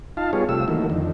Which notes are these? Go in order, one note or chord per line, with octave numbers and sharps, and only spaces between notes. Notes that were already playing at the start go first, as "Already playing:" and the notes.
D#4 F4 F5 A5
G3 B3 F4 G#4 C#5
C3 G3 A3 F4 E6
D#3 E3 F#3 A3 A#3
F2 D3 D#3